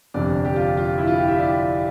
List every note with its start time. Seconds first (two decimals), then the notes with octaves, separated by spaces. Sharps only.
0.14 G1 F2 C3 D5
0.45 G4
0.56 F4
0.77 F4
0.98 E4
1.07 F4
1.18 G4
1.28 E5
1.38 D5